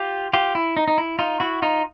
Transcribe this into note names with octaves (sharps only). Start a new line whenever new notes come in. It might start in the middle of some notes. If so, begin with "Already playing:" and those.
Already playing: F4 G4
F4 G4
E4
D#4
D#4
E4
D#4 F4
E4 F#4
D#4 F4